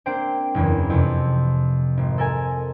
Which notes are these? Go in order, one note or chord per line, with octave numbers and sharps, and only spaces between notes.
A#3 C4 D4 C5 G5
F#1 E2 C#4
F2 C3
G#1
A4 A#4 G#5